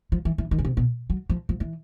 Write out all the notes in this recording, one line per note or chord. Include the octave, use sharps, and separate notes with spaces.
F3
E3
E3
D#3
C#3
C3
B2
F#3
F3
F3
E3